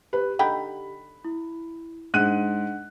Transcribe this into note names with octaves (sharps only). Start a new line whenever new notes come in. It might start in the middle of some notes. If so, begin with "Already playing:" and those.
G4 B4
D3 D#4 G5 B5
E4
G#2 D4 F#5 F#6 D#7